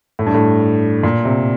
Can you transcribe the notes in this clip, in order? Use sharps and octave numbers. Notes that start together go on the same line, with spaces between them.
A2
G2
A2
A#2
C3